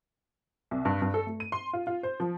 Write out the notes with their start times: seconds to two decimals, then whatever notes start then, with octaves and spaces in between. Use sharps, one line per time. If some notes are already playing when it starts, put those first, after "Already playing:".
0.71 C2
0.85 G2
1.02 G2
1.14 A4
1.27 A3
1.40 D#7
1.52 C6
1.73 F4
1.87 F4
2.03 C5
2.20 F3